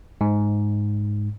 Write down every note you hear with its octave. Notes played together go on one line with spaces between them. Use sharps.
G#2